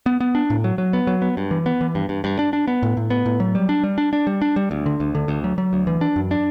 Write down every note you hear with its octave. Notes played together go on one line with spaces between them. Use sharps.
B3
B3
D4
A2
F#3
F#3
B3
F#3
B3
G2
E3
B3
E3
G2
G2
G2
D4
D4
B3
A2
A2
B3
A2
F#3
G3
D4
G3
D4
D4
G3
D4
G3
D2
D3
D2
D3
D2
F#3
F#3
D2
E3
D4
F#2
D4